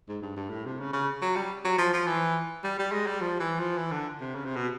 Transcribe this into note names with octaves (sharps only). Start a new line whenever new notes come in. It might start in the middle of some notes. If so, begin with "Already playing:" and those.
G#2
G2
G2
A2
C3
C#3
C#3
F#3
G3
F#3
F3
F3
E3
G3
G3
G#3
G3
F3
E3
F3
E3
D3
C3
C#3
C3
B2